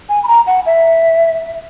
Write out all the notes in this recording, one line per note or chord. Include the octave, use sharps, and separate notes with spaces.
G#5
B5
A#5
F#5
E5